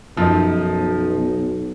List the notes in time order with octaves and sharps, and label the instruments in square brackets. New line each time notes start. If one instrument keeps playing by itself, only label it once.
[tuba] B1 [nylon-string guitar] F#2 [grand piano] F3 D#4